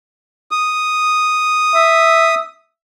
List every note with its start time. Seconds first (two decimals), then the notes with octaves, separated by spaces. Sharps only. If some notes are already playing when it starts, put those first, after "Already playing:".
0.51 D#6
1.75 E5